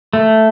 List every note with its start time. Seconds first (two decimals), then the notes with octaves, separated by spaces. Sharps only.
0.13 A3